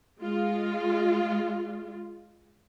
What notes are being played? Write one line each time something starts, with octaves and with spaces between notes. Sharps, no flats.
G#3 F4